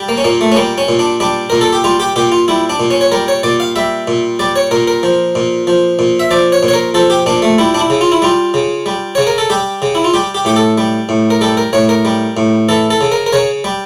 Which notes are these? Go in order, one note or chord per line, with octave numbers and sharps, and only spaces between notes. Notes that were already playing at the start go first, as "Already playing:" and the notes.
Already playing: G3
A#3
C#4
A#2 A#3
A3
C#4
G3 A#3
C#4
A#2
D4
G3 D4
A#2 A#4
A4
G4
G3 F4
G4
A#2 G4
F4
G3 E4
D4
A#2
C#4
C#5
G3 A#4
C#5
A#2 D5
F5
G3 E5
A#2
G3 D5
C#5
A#2 A#4
A#4
F3
A#2
F3
A#2
E5
F3 D5
C#5
A#2
C#5
A#4
F3 A4
G4
A#2 D4
A3
G3 E4
D4
E4
C#3
F4
E4
G3 F4
C#3
G3
C#3 C#5
A#4
A4
G3 G4
C#3
E4
F4
G3 G4
G4
A2 G4
A4
G3
A2
A#4
G3 A4
A#4
A2 C#5
A#4
G3
A2
E3 A4
A4
C#3
A#4
A#4
C#3 C#5
G3